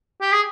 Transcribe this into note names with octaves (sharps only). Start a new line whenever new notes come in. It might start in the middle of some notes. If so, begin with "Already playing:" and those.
G4
G#4